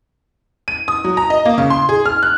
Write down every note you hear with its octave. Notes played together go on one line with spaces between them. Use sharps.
D#7
D#6
F#3
A#5
D#5
A#3
C#3
C6
G#4
F6
F#6